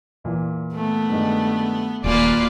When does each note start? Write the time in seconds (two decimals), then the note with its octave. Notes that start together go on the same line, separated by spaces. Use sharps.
0.24 E2 A#2 E3
0.74 A3 B3
1.09 G2 D#3 G#3
2.04 D#1 A#3 F4 B4 D5 G#5 D7